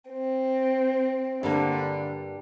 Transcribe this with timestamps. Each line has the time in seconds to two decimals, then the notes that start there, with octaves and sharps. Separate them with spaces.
0.11 C4
1.43 G2 D3 G3 A#3